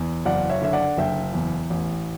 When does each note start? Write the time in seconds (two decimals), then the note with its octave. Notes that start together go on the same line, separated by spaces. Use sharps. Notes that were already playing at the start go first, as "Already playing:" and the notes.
Already playing: E2
0.25 F#1 D5 F#5
0.50 C#5 E5
0.62 D3 E5
0.73 D5 F#5
0.97 F#1 E5 G5
1.34 E2
1.70 A1